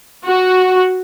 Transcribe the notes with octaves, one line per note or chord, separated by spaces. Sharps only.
F#4